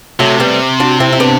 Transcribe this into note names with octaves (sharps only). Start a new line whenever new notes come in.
C3 F#3 A3
G3 B3
D4 F#4
C4 E4
E4
B3 D4